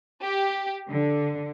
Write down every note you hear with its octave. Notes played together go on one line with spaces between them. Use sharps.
G4
D3